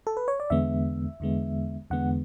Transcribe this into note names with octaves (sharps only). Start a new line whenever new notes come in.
A4
B4
C#5
D5
E2 D3 G#3 B3 E5
E2 D3 G#3 B3
E2 D3 G#3 B3 F#5